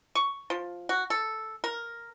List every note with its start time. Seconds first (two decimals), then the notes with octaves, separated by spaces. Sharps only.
0.15 C#6
0.50 F3
0.89 F#4
1.10 A4
1.64 A#4